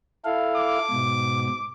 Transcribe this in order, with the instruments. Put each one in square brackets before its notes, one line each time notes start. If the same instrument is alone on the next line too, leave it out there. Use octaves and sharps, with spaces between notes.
[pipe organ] E4 A4 F5
[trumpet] D6
[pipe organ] G#2 B2